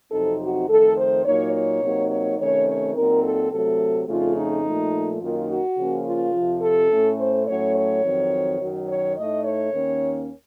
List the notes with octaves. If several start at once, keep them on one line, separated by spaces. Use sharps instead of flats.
F2 C3 F#3 C4 D#4 A4
F#4
F2 D#3 A3 A4
C5
A#2 F#3 A#3 D#4 C#5
C#5
C3 F#3 A#3 D#4
C#5
C3 D#3 A3 C#4 C#5
C#5
A#2 F#3 C4 D#4 A#4
A4
C3 F#3 A3 A4
F2 C#3 A3 D#4 F4
D#4
A#2 F3 A3
F#2 D#3 A#3 D#4 F4
F#4
C#3 F3 A#3 C#4
F4
F2 C3 F3
A4
A2 A3 C#4
C5
A2 F#3 A3 C#4 C#5
C#5
F2 D#3 F#3 C4
F#2 D#3 F#3
C#5
A2 A3 D#4 D#5
C#5
D#2 D#3 A#3 C#4